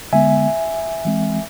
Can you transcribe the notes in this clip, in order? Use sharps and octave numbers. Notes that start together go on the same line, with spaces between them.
D3 G#3 B3 E5 G#5
E3 G#3 C4